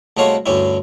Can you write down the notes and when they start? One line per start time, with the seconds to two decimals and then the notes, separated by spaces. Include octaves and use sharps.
0.17 C2 G#3 A3 F#4 C#5 F5
0.46 D2 G2 C#4 E4